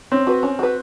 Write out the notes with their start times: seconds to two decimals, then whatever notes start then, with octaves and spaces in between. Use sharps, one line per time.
0.12 C4 C#4
0.27 F#4 B4
0.43 C#4
0.59 F#4 B4